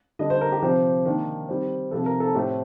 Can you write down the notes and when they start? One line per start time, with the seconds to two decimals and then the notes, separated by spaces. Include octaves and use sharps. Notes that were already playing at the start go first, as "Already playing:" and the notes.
0.19 D3 G3 D4 D#5
0.30 C5
0.41 A#4
0.52 G4
0.62 C3 F3 C4 G4
1.05 D#3 A#3 D4
1.49 D#3 G3 C4
1.91 C3 F3 C4 A4
2.06 A#4
2.20 A4
2.34 A2 A3 C4 G4